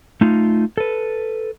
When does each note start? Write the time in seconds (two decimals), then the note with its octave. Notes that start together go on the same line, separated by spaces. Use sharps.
0.21 A3 D#4 F4
0.77 A4 B4